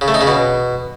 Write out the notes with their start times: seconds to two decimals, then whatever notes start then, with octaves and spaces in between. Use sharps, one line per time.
0.01 C#3
0.08 A3
0.14 D#4
0.21 C#3
0.27 B2